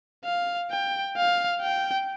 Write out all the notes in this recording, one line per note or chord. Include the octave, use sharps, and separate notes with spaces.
F5
G5
F5
G5